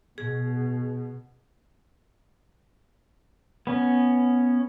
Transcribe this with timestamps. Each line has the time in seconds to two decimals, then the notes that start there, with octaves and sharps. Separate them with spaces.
0.18 B2 G#4
3.67 B3 C#4